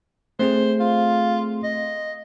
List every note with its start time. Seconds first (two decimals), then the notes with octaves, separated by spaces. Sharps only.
0.39 A3 C4 G#4 C5
0.80 F4
1.63 D#5